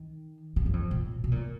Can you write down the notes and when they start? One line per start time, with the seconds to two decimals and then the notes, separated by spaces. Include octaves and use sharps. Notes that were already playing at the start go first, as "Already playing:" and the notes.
Already playing: D#3
0.56 C#3
0.66 F#2
0.73 F2
0.91 A#2
1.24 B2
1.32 A#2